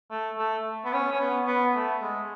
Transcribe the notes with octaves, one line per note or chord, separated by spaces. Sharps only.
A3
A3
B3
C#4
C#4
B3
B3
A3
G#3